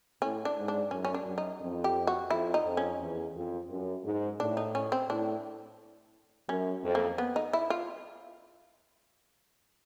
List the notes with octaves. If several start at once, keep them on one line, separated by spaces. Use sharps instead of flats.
A2 C#4
D4
G#2
D4
F#2 C#4
C#4
D4
F#2
D#4
F2
G4
F#4
F2 E4
D#4
F2
C#4
E2
F2
F#2
G#2
A2 D4
D#4
C#4
C4
A2 D4
F#2 C#4
F2
A#3
B3
D#4
E4
F4